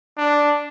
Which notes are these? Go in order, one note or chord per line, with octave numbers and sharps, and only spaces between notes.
D4